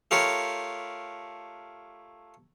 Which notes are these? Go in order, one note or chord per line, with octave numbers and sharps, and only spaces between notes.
A3 F4 G4 A#4 C#5